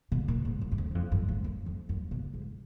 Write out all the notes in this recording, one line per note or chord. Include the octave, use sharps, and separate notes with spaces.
B2
A#2
G#2
F#2
F#2
F2
F#2
F2
F#2
G#2
F#2
F2
F#2
B2
G#2